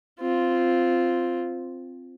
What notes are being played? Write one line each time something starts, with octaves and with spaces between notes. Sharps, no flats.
C4 F4